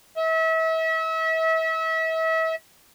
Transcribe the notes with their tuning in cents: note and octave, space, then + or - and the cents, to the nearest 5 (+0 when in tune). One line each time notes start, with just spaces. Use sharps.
E5 -35